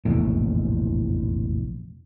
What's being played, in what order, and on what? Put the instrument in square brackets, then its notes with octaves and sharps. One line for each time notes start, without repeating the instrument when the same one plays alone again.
[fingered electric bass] F1 A#1 E2 A2